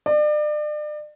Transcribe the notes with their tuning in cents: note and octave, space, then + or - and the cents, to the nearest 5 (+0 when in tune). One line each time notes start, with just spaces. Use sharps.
D5 +35